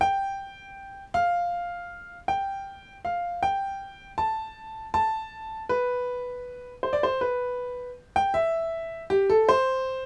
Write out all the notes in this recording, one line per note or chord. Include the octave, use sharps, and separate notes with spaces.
G5
F5
G5
F5
G5
A5
A5
B4
C5
D5
C5
B4
G5
E5
G4
A4
C5